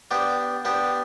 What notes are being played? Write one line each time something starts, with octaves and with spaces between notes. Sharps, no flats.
B3 D4 G4
B3 D4 G4